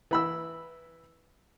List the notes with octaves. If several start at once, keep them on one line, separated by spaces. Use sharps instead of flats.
E3 B5 E6